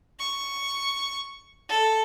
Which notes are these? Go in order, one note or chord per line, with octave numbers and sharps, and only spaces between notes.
C#6
A4